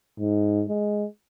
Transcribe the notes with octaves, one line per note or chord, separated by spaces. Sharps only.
G#2
G#3